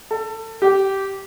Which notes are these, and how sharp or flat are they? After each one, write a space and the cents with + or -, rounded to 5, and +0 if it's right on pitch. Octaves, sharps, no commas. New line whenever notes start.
A4 +25
G4 -15